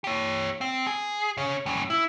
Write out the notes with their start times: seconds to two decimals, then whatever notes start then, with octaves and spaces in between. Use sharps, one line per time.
0.04 G4 C#5
0.61 C4
0.87 G#4
1.37 C#3 C#5
1.66 G3 C#4
1.90 E4